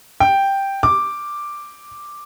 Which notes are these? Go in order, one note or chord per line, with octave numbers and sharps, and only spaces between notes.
G5
D6